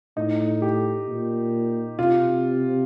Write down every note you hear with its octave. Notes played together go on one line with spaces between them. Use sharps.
A2 D#4
G4
A#2
C3 F4